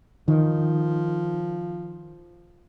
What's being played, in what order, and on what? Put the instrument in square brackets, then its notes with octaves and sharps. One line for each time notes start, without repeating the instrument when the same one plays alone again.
[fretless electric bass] D#3 [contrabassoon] F3